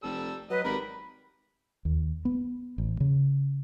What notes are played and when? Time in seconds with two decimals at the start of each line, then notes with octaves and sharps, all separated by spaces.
0.03 F1 G3 A4 E6
0.50 F#3 B4 D#5
0.64 G#1 G3 A#4 B5
1.85 D#2
2.25 B3
2.78 A1
3.00 C#3